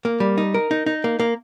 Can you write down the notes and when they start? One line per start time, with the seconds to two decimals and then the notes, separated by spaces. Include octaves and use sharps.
0.05 A#3
0.20 G3
0.38 D#4
0.54 A#4
0.71 D#4
0.86 D#4
1.04 A#3
1.20 A#3